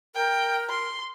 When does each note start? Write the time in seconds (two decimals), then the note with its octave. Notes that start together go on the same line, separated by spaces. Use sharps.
0.15 A#4 G5
0.69 C6